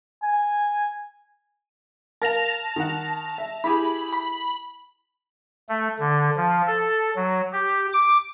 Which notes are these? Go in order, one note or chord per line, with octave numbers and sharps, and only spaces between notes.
G#5
A#4 F5 A5 A#6 F7
D#3 F#5
E5
E4 G4 G#4 B5
B5
A3
D3
F3
A4
F#3
G4
D6